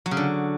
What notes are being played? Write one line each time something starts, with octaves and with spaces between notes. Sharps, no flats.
F#3
C#3
D3